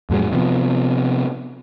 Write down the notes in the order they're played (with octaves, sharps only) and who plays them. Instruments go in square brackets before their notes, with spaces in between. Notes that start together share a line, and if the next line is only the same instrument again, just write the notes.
[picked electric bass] F2 A2 F#3 G#3
C3 F3 B3